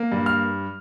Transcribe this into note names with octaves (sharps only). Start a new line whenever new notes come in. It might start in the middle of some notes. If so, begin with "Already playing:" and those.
Already playing: A#3
G2
F6